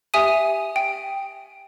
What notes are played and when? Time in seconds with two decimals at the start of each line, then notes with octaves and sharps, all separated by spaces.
0.14 G4 E5 G#5 D#6 D#7
0.76 G5